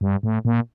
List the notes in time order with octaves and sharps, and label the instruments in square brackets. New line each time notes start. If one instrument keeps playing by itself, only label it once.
[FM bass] G2
A2
A#2